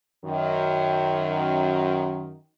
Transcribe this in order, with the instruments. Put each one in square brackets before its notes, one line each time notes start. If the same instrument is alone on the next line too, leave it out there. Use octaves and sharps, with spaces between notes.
[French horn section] F#2 D#3